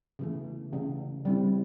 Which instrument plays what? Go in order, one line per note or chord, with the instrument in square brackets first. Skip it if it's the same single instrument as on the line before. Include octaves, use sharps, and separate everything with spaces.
[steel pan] C#3 E3 A3
C#3 E3 A3
G3 C4 E4